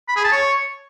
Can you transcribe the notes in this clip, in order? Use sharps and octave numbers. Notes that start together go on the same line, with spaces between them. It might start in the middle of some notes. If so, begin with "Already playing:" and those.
B5
G#4
A5
C#5